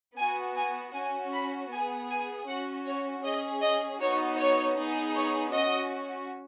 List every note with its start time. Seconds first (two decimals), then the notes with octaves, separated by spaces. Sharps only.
0.18 B3 F#4 G#5
0.56 G#5
0.94 C#4 F#4 G#5
1.32 B5
1.71 B3 G#4 G#5
2.10 G#5
2.47 C#4 F#4 F#5
2.86 C#5
3.24 C#4 G#4 D#5
3.62 D#5
4.00 B3 D#4 F#4 C#5
4.38 C#5
4.77 B3 D#4 G#4
5.16 C#5
5.54 C#4 F#4 D#5